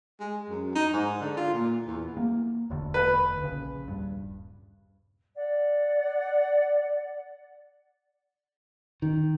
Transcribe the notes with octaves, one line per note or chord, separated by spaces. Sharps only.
G#3
F#2
D#4
G#2
D3
F4
A#2
E2
A#3
E1 D2 D3
B4
A#1 C#3
D#1 G2
D5 F#5
D#3